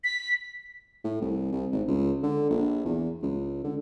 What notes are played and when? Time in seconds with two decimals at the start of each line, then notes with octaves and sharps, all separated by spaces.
0.04 B6
1.04 A2
1.21 C2
1.52 C2
1.72 G#1
1.88 C#2
2.23 D3
2.50 A#1
2.85 E2
3.23 C#2
3.64 D3